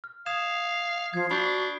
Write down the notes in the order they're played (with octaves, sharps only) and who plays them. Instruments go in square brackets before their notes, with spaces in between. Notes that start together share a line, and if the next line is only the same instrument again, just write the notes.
[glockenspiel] F6
[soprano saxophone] F5 [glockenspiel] D#6 G#6 E7
[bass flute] F3 [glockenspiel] G#6 C7
[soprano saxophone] D4 [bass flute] F#4 [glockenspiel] B5 C#6 G6